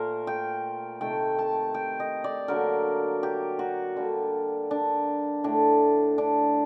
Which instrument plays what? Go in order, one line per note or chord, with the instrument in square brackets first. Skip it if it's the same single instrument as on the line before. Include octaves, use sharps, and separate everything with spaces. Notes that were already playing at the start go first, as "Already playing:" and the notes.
Already playing: [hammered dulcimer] A#2 A3 A#4 C5
G5
C3 D#3 A3 G5
A5
G5
D#5
D5
D3 F#3 A#3 A#4
G4
F#4
D3 G3 A#3
D4
A2 A3 D4
D4